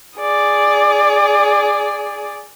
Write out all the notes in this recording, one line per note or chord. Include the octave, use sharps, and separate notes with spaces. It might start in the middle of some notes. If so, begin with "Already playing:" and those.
G#4 D5